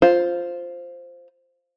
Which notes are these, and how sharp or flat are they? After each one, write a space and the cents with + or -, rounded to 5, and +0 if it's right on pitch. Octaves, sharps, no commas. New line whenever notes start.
F4 +0 C5 +0